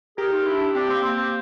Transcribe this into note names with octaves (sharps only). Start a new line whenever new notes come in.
G4 G#4 A#4
D#4 F4
D4 E4
C4 D4 G4
A#3 C4
A#3 C4